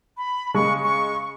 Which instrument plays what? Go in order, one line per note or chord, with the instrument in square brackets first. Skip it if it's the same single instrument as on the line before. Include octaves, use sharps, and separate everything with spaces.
[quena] B5
[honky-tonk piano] C#3 G#3 [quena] C#6
[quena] C#6